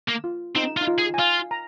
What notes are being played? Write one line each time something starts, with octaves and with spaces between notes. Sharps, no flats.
A#3
F4
C4 D#4
F4
D#4
F4
G#4
G#5
F4 F5
A#5